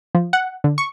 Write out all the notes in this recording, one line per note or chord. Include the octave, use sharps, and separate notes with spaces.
F3
F#5
D3
C#6